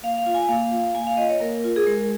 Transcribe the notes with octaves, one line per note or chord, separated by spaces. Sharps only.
A#3 F5
F5
F4
G#5
A#3 F5
F4
A#3 G#5
F5
F4 D#5
C#5
A#3 A#4
F4
G#4
G#3 A#4